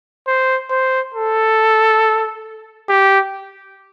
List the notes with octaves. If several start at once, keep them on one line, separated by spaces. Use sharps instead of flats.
C5
C5
A4
G4